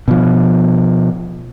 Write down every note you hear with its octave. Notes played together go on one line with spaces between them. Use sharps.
B2 F3